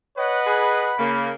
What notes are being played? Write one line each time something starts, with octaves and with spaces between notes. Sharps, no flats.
B4 C#5 D#5 F#5
G#4 B5
C#3 A#3